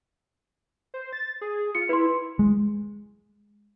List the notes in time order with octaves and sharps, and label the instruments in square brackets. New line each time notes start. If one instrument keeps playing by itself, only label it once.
[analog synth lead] C5
A6
G#4
[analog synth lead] F4 [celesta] C#7
[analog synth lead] E4 [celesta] B4 C6
[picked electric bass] G#3